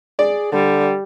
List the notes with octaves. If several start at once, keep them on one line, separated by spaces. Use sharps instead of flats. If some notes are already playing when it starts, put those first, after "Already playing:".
G#4 D5
D3 G3